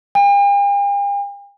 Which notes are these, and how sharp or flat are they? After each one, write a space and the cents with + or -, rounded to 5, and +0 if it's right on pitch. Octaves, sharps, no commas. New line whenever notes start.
G5 +45